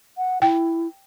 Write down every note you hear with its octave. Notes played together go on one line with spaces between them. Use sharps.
F#5
E4 G5